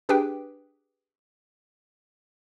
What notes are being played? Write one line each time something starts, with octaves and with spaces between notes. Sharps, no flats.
D4 G4 G#4 B4 G5